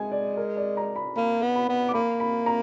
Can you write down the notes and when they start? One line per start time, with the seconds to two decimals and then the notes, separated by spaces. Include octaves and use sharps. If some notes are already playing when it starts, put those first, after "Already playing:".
Already playing: G#3 G#5
0.12 D5
0.37 A#4
0.57 D5
0.77 A#5
0.96 B5
1.16 A#3 B5
1.42 B3
1.56 B5
1.69 B3
1.88 D6
1.94 A#3 B5
2.20 B5
2.46 A#5